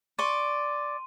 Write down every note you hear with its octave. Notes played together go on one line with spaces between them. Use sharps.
D5 C6 C#6 D#7